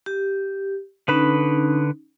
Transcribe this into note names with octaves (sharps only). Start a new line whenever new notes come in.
G4
D3 C#4 D#4 B4 B5